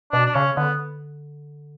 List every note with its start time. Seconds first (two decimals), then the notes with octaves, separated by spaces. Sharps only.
0.12 B2 D4
0.26 D4
0.35 C#3 C#4
0.57 D3 B3